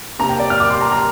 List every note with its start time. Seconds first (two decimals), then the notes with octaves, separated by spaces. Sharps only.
0.19 C3 A#3 D4 A#5
0.29 G5
0.40 D5
0.50 F6
0.60 D6
0.70 C6
0.81 A#5
0.92 A#5